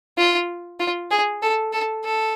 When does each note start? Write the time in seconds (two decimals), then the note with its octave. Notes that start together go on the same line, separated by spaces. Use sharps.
0.18 F4
0.80 F4
1.10 G#4
1.42 A4
1.73 A4
2.04 A4